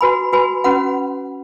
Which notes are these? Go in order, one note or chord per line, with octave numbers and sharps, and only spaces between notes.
F#4 B4 G#5 B5
F#4 B4 G#5 B5
C#4 F#4 B4 F#5 B5